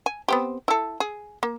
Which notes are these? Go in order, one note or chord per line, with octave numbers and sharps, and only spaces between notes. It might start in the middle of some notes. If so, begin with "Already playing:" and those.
G#5
B3 C4 G4
E4 A4
G#4
A#3